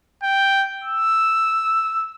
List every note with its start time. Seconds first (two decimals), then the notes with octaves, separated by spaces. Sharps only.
0.23 G5
0.84 E6